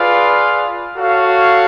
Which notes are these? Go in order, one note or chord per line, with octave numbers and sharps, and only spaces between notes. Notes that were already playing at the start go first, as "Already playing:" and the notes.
Already playing: F4 G#4 B4 D5 F5
F#4 A4 C#5 F5